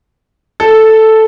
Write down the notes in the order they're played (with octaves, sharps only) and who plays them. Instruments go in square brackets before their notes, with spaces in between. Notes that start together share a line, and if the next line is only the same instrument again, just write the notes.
[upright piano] A4